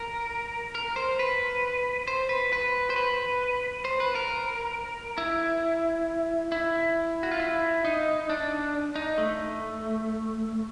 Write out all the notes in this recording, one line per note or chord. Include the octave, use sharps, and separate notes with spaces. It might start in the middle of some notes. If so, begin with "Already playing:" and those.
Already playing: A#4
A#4
C5
B4
C5
B4
B4
C5
B4
C5
B4
A#4
E4
E4
F#4
F4
E4
D#4
D4
D#4
A3